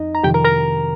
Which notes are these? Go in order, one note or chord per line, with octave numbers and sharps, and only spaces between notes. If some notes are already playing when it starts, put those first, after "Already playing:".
Already playing: F2 D#4 D#5
A#5
F2 C3 D#3 G4 G5
A#4 A#5
A#4 A#5